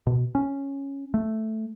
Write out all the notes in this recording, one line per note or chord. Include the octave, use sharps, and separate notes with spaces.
B2
C#4
A3